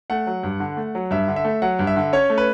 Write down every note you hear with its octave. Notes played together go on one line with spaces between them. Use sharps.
A3 F#5
F#3
G2
D3
A3
F#3
G2 E5
D3
E5
A3
F#3 F#5
G2
E5
D3
C#4 C#5
A3
B4